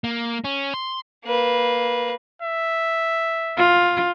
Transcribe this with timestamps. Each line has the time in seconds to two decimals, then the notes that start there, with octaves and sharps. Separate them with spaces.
0.04 A#3
0.44 C#4
0.74 C6
1.25 A#3 B4
2.42 E5
3.57 F4